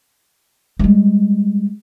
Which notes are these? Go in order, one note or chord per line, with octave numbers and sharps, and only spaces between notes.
G3 G#3